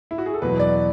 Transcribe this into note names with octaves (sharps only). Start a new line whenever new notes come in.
E4
F#4
G#4
A4
E2 B2 F#3 B4
D5